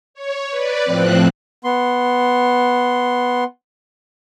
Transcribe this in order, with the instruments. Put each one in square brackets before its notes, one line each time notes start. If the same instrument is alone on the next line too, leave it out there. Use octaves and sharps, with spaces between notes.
[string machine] C#5
B4 D5
A2 F3 C4 F#6
[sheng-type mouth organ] B3 C6